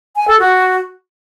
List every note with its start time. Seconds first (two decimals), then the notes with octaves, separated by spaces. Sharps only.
0.16 G#5
0.28 A4
0.39 F#4